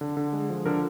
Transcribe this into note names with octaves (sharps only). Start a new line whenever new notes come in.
D3
D3
G#3
F3
D3 A#4